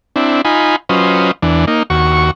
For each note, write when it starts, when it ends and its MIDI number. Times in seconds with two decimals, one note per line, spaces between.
0.16 0.41 60
0.16 0.41 62
0.16 0.41 64
0.45 0.76 63
0.45 0.76 65
0.45 0.76 80
0.45 0.76 83
0.89 1.31 54
0.89 1.31 61
0.89 1.31 65
0.89 1.31 71
0.89 1.31 72
0.89 1.31 75
1.42 1.65 40
1.42 1.65 52
1.42 1.65 62
1.67 1.83 58
1.67 1.83 63
1.90 2.31 39
1.90 2.31 66
1.90 2.31 85